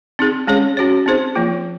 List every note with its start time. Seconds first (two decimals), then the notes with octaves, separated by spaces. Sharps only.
0.19 C4 D#4 G#4
0.47 G#3 C#4 G#4 C#5
0.77 C#4 F#4 C#5
1.06 C4 D#4 G#4 C5
1.35 F3 A#3 F4